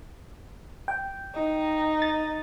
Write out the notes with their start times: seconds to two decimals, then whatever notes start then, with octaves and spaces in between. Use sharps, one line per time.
0.88 G5
1.35 D#4
2.02 A6